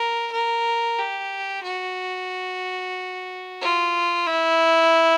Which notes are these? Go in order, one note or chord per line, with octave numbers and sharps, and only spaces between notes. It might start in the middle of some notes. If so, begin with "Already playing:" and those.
Already playing: A#4
A#4
G4
F#4
F4
E4